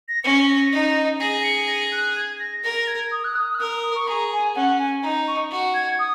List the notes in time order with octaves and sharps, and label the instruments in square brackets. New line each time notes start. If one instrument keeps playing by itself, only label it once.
[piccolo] A#6
[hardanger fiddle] C#4 [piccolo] C#7
[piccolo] A#6
[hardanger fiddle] D#4
[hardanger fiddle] G#4 [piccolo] A#6
[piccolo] C#7
A#6
F#6
G#6
A#6
[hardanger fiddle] A#4 [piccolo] A#6
[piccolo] A#6
G#6
D#6
F#6
D#6
F#6
[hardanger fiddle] A#4 [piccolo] D#6
[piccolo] D#6
C#6
[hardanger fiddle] G#4 [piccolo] A#5
[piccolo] G#5
[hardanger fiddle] C#4 [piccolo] F#5
[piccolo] G#5
[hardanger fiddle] D#4 [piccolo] A#5
[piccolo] C#6
[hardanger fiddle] F#4
[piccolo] G#6
D#6